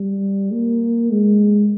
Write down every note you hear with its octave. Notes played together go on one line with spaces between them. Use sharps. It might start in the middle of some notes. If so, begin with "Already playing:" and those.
Already playing: G3
A#3
G#3